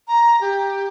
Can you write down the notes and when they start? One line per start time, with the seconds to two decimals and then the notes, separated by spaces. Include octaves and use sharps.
0.08 A#5
0.41 G4